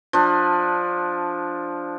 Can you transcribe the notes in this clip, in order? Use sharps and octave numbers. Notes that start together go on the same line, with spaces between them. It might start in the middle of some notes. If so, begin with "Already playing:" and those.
F3 D4